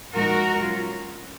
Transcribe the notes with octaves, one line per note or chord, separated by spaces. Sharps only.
A#2 F3 G#3 D#4 F#4 A#4
F#3 C#4 F4